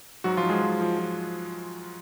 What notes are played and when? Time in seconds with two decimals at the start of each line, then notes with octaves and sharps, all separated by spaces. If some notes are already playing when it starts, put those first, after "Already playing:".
0.24 G#2 F#3 F#4
0.37 F3 F4
0.43 G#2
0.50 G#3 G#4
0.62 F3
0.81 F3
0.99 F3